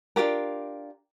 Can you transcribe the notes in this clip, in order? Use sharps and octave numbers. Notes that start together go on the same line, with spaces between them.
D4 F4 G4 A#4